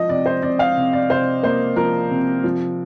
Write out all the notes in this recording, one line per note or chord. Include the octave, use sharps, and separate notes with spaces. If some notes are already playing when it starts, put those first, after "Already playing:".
Already playing: F3 D#5
C3 D5
C5
C3 D5
F5
C3
D5
C3 C5
A#3 C5
F3 A#4
C3
F3